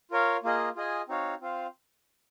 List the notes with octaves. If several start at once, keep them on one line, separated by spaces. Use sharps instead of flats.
F4 A#4 C#5 F5
A#3 F4 G#4 D#5
F4 G#4 D#5 G#5
C4 D#4 F#4 C#5 F5
C4 F4 C5 F5